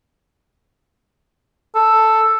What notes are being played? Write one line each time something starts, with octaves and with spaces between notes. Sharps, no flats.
A4